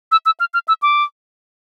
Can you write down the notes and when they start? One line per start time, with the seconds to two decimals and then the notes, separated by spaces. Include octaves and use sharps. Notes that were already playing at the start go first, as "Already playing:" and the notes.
0.12 E6
0.26 E6
0.40 F6
0.54 F6
0.68 E6
0.82 D6